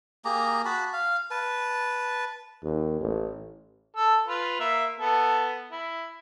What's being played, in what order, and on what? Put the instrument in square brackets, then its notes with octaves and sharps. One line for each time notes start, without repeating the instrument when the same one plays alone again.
[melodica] A#3 G4 G#4 A#5
F#4 A5 B5
F5
B4 A5
[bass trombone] D#2
A1
[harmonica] A4 E6
F4 B4
A#3 E5
B3 A4
E4